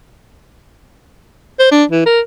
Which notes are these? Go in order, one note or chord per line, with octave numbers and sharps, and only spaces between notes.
C5
D4
E3
A#4